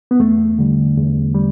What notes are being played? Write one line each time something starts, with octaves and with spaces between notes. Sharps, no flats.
B3
E2 A3
D3 G3
E2
G3